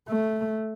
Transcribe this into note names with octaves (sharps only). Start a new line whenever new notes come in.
A3